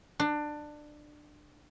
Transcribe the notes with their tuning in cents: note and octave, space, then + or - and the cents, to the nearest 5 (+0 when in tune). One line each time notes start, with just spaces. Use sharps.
D4 +20